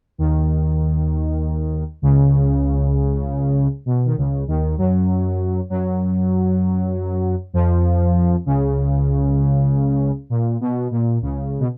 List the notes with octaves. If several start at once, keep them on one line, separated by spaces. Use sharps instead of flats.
D#2 D#3
C#2 C#3
B2
D#3
C#2 C#3
D#2 D#3
F#2 F#3
F#2 F#3
F2 F3
C#2 C#3
A#2
B2
A#2
C#2 C#3
B2